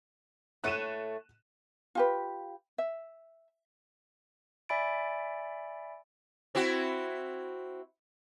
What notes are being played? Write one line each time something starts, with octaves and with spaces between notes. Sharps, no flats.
A2 A3 C#5 F#6 D#7 E7
F4 G4 B4
E5
D5 E5 G#5 B5 A6 D7
C4 E4 F#4